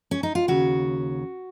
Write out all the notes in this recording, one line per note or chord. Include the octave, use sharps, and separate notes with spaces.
C#4
D#4
F4
D#2 C#3 F#4